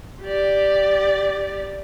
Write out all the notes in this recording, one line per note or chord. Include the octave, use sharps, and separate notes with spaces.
G4 D5